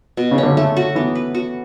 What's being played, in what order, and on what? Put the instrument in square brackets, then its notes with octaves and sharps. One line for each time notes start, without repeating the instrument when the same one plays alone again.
[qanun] B2
[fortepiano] C#3
[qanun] C#4
[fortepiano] D3
[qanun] A3
F#4
[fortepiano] E3 [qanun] B3
[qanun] B4
F#4